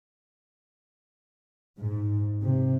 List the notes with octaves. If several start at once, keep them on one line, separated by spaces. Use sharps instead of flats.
G#2
C3